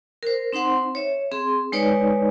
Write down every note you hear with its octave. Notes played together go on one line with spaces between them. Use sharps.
A#4 C5
C4 D#4 C5 F#5 C6
C#5 E5
C4 G#4 C6
G#3 D#4 B4 C#5 D5 G#5